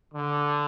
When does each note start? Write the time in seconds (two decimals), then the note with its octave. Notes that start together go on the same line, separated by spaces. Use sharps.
0.14 D3